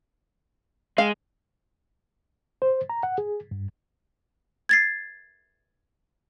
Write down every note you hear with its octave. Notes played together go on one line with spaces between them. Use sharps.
G#3 F5
C5
A#5
F#5
G#4
G2
G#6 A6 C7